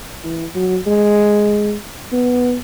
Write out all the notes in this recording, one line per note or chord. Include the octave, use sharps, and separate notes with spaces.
E3
F#3
G#3
B3